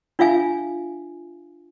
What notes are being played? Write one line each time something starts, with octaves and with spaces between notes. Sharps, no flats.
D4 F4 E5 F5 G#5